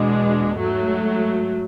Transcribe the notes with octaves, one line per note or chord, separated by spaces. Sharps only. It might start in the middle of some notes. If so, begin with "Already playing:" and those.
Already playing: E2 B2 G#3 D4
G#2 F#3 A3